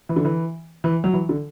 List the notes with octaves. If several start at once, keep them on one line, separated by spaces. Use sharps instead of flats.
E3
D3
E3
E3
F#3
E3
D3